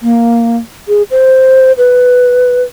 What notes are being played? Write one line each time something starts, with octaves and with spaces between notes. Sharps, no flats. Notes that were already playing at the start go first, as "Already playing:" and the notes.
A#3
G#4
C5
B4